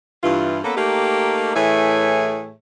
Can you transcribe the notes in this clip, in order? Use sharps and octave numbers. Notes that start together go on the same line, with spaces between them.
G2 E3 F4
A#3 B3 C#4 A4
A3 A#3 D#4 G4
A2 E3 A3 G#4 C#5 E5